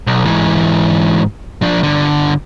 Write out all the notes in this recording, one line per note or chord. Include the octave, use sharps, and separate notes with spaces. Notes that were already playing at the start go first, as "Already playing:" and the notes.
B1
G#2 E3
F3 D4
G2 D3